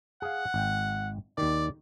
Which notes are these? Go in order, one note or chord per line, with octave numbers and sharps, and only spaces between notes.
G#4 F5 F#5
G#1 G5
D#2 D#3 D5